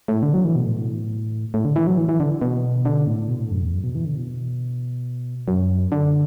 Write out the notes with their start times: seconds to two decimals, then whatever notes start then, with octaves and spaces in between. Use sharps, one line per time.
0.08 A2
0.23 D3
0.34 F#3
0.44 E3
0.56 B2
0.66 A2
1.54 A2
1.65 D3
1.76 E3
1.87 F#3
1.98 E3
2.09 E3
2.20 D3
2.42 B2
2.85 D3
3.07 A2
3.29 B2
3.40 A2
3.51 F#2
3.62 E2
3.73 F#2
3.84 B2
3.95 E3
4.05 D3
4.17 B2
5.48 F#2
5.92 D3